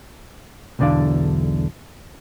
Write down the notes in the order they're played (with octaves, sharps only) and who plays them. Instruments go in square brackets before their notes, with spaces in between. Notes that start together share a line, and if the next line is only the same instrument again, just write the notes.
[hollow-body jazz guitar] B1 E2 D3 D4 D5 F5